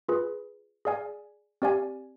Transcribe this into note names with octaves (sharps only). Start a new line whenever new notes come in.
F4 G#4 B4
G#4 D5 F5 G#5
C4 G4 D5 F5 G#5